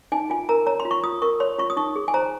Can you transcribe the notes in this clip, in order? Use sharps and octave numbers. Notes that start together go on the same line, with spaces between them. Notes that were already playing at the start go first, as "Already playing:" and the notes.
D#4 G#5
F4 G#5
A#4 A#5
C#5 A#5
C6
F4
C#6
F4 D#6
A#4 C#6
C#5 C6
F4 C#6
D#6
D#4 C#6
G#4
G#5
C5 A#5